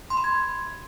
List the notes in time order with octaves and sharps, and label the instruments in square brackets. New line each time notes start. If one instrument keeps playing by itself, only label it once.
[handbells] C6
B5
G#6